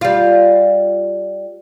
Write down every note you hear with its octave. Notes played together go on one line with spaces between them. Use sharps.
G3 F4